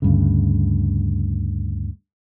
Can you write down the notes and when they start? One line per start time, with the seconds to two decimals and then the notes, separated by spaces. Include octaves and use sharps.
0.02 D2 G2 C#3